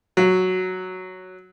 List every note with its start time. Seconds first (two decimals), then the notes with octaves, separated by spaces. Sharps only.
0.17 F#3